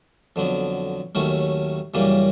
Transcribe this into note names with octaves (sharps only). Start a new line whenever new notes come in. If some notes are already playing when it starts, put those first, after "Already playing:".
F2 D3 F#3 B3
D#2 D#3 F#3 A3 C#4
F#2 C#3 E3 G3 A#3